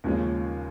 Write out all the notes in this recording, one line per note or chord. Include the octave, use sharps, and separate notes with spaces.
D#2 C#3 F3 G#3 C#4